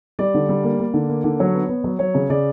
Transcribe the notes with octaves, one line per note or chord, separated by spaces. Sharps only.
G3 D5
D3
G3
A#3
A#3
D3
A#3
D3
F#3 C#5
B3
B3
F#3
F#3 C#5
C#3
C#3 D5